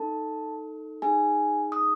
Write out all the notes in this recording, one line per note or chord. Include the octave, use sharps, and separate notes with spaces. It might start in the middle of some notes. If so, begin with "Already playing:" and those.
Already playing: D#4 A4 A5
D#4 G#4 G#5
D#6